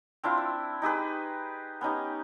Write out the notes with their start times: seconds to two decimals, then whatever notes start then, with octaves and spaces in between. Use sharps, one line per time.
0.23 C4 D4 E4 F4
0.38 E5
0.82 D#4 G4 G#4 B4
1.81 B3 C#4 D#4 G4